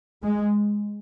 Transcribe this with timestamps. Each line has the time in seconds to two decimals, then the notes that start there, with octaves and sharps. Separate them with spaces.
0.23 G#3